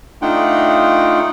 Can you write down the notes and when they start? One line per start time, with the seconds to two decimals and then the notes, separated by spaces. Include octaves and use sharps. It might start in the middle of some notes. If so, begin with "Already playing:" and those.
0.22 A3 D4 D#4 F4 F#5 G5